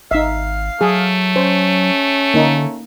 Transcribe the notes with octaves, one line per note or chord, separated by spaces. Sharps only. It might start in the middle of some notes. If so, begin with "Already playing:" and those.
G#1 D#4 E5 F5
F#3 A3 G#4
C#4 C5
D3 A#3 D#4